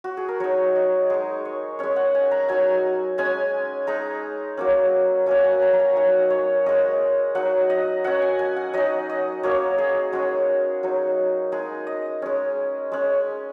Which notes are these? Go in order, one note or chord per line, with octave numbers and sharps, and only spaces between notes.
F#4
G#4
A#4
F#3 D#4 C#5
D#5
G#3 D#4 G#4
C#5
G#3 C#4 C#5
F#5
G#5
A#5
F#3 D#4 G#5
G#3 C#4 G#5
G#3 D#4 A#5
F#3 A#3 C#4
F#3 A#3 C#4 G#5
F#5
G#5
A#5
A#5
G#5
F#3 D#4 F#5
C#5
G#3 C#4 D#5
F#3 D#4 F#5
D#5
F#3 C#4 F#5
G#5
G#5
F#5
F#3 D#4 D#5
D#5
F#3 A#3 C#4 C#5
G#4
G#3 C#4 F#4
F#3 D#4
G#3 D#4 G#4
D#5
G#3 C#4
G#3 C#4